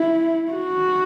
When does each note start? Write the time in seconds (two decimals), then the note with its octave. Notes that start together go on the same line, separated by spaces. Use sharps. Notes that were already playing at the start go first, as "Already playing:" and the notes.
Already playing: E4
0.52 F#4